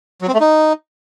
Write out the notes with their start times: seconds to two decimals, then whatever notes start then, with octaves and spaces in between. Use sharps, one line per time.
0.22 F#3
0.28 C4
0.34 A3
0.40 D#4